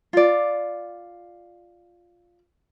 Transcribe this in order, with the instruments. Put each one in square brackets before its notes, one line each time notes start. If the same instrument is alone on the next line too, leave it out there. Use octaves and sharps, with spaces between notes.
[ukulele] F4 D5